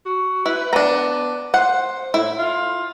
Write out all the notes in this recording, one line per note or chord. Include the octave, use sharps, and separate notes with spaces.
F#4
E4 B4
B3 D4 A#5
C5 F#5
A2 E4
F4